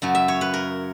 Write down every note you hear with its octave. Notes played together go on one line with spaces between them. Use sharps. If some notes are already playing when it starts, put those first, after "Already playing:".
F#2 C#3 F#3
E5
C#5
B4
A#4